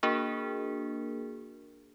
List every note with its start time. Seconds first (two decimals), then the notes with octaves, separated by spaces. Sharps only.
0.03 A#3 D4 F#4 G#4 A#4